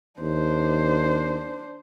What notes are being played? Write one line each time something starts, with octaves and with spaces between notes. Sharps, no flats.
D#2 D4 C5